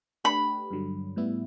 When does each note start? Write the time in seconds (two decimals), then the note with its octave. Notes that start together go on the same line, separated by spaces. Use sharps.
0.24 A3 D4 G4 B4 B5
0.71 G2 D3 F#3
1.16 A2 G3 B3 E4